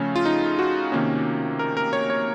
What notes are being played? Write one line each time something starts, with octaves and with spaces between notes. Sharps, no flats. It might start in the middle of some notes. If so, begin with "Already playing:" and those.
Already playing: C#3 F3 A3 C#4
F4
D#4
F#4
C3 D#3 A#3 C#4
A#4
A#4
C#5
C#5